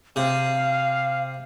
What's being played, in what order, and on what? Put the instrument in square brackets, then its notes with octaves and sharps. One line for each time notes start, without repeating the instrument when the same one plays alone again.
[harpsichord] C3 [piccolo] F5